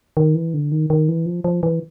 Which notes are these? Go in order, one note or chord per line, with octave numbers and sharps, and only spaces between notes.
D#3
E3
D3
D#3
D#3
E3
F3
F3
E3